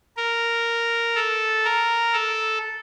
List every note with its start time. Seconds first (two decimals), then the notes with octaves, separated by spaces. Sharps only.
0.17 A#4
1.15 A4
1.65 A#4
2.13 A4